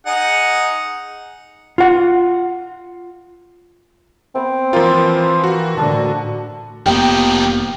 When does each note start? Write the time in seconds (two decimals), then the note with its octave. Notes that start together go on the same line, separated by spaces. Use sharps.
0.06 D#4 G#4 F#5
1.78 F4 F#5
4.35 B3 C4
4.73 E3 F3 A#3 F4 C6
5.44 F#4
5.77 A2 D3 A5
6.86 F1 F3 A#3 B3 D#4 G4 G5